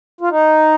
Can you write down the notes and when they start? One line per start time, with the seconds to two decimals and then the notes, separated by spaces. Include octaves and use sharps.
0.21 F4
0.30 D#4